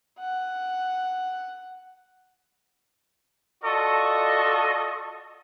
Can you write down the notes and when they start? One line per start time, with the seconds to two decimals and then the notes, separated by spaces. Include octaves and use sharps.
0.18 F#5
3.64 F4 F#4 A4 D5 D#5 C#6